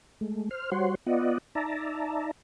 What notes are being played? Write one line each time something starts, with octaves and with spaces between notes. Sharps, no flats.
G#3 A3
C5 F6
G3 F#4 C5 C#5 F#5 C6
B3 F4 D5 D#5 F#5
D#4 D5 E5 A5 A#5